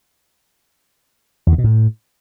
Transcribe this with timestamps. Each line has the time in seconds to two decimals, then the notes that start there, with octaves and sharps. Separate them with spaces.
1.47 E2
1.53 D#3
1.58 B2
1.64 A2